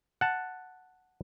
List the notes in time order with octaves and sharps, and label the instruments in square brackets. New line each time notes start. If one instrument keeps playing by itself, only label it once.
[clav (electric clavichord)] F#5 A5